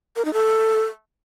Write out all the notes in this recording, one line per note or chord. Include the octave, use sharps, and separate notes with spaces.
A#4
D#4
A4